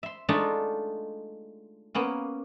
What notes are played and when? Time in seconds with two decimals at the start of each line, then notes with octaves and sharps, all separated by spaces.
0.03 E5 C6
0.29 G#3 A3 D4 D#4 F4
1.95 A#3 B3 C#4